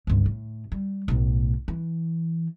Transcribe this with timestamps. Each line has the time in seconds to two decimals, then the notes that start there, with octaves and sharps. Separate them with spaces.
0.07 G1 C#2
0.26 A2
0.72 G3
1.08 B1 A2
1.68 E3